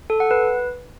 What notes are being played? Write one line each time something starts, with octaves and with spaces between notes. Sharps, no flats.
A4
F#5
B4